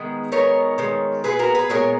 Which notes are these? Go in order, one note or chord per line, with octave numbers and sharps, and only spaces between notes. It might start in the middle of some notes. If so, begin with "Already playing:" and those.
Already playing: D#3 G#3 B3
D#3 G#3 B3 A#4 C#5
D#3 G#3 B3
A#2 G#3 B3 G#4 B4
F#4 A#4
G#4 B4
A#2 G#3 B3 A#4 C#5